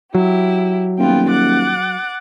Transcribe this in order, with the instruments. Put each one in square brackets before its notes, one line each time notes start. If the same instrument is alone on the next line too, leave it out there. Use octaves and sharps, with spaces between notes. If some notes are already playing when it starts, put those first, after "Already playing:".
[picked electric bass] F#3 [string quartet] E4 G4
[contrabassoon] D#1 [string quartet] B3 F4 G5
[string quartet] F#5 D6 A6